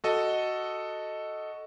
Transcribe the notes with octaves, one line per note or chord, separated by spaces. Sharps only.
F#4 A4 D#5